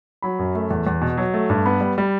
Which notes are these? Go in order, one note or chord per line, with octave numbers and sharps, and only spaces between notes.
F#3 B5
F#2
A3
E2
E2
B2
F#3
A3
G2
B3 B5
G3
G3